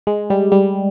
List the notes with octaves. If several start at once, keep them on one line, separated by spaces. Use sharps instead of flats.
G#3
G3
G3